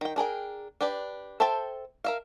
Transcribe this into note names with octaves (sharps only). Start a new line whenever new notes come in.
D#3 G5
D4 G#4 A#4 G5
D4 G4 B4 D5
A4 C5 E5 G5 A5
A#4 E5 F5